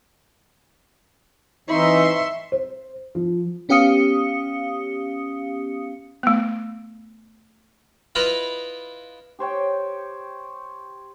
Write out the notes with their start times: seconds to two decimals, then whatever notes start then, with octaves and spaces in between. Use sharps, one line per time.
1.69 E3 C4 D#4 E5 C6 C#6
2.52 C5
3.15 F3
3.69 B3 C#4 G4 F5 D#6 C#7
6.23 A3 B3
8.15 E4 F4 B4 D#5 F5
9.39 G4 C5 C#5 G5